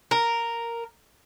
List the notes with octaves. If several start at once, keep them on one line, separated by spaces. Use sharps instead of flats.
A#4